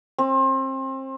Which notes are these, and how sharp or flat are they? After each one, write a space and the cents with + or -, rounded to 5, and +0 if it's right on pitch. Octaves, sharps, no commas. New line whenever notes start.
C4 +30